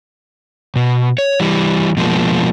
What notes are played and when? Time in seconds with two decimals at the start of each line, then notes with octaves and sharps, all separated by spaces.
0.76 B2
1.18 C#5
1.40 E3 G3
1.97 B2 F3 G#3 A#3